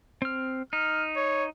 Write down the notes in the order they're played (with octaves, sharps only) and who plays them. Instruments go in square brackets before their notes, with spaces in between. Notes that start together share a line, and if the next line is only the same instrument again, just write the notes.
[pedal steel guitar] C4 F6
[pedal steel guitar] D#4 [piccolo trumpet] F6
[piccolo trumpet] C#5